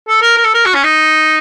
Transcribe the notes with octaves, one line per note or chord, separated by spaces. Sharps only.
A4
A#4
A#4
A4
A#4
F#4
C#4
D#4